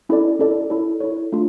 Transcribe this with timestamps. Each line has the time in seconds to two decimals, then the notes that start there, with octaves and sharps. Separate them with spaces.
0.09 C#4 E4 A4 D5
0.39 C#4 E4 A4 D5
0.70 E4 A4 C#5
1.00 E4 A4 C#5
1.32 A3 D4 F4